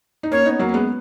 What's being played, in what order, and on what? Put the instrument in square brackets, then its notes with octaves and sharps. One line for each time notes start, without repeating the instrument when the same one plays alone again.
[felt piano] D#4
[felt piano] A#3 C#4 [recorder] C#5
[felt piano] B3 D#4
F#3 A#3
C#4
G#3 B3